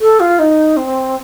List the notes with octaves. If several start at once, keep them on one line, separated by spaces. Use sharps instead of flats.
A4
F4
D#4
C4